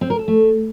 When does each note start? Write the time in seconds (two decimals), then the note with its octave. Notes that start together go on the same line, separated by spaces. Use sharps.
0.01 C4
0.10 A#4
0.19 A4
0.28 A3